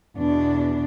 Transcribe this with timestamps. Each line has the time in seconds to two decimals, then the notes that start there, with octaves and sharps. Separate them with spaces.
0.16 E2 B2 D4